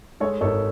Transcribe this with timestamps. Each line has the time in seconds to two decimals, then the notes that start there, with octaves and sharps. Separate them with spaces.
0.20 G#3 A4 C#5
0.41 G#1 A4 C#5